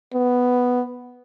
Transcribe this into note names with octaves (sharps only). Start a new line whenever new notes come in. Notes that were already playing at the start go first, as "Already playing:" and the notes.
B3